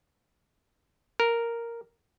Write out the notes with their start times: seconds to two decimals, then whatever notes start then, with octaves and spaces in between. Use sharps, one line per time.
1.20 A#4